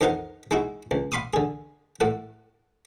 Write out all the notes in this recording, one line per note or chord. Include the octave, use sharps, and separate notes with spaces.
F2 D#3 D#4 A#4 F5 F#5
G#3 D#4 E4 F#4
C#2
F5 B5 C6 D6 D#6
D3 G#4
A2 A4 F#5